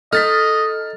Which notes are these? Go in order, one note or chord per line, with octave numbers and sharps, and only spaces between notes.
D#4 A4 D#5 F6 A6 B6